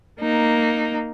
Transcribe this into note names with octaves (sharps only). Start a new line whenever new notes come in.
A#3 D#4